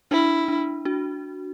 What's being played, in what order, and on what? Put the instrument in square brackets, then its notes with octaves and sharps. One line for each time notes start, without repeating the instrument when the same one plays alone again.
[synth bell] D4 [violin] E4
[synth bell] D4
D4 F#4